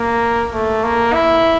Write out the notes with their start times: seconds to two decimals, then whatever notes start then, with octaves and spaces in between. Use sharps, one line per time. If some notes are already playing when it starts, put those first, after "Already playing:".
Already playing: A#3
0.53 A3
0.84 A#3
1.13 E4